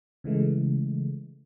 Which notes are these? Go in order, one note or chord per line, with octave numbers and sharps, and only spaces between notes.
C#3 E3 G#3 A3